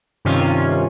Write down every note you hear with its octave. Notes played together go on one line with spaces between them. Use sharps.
G2 C3 D#3 C#4 F4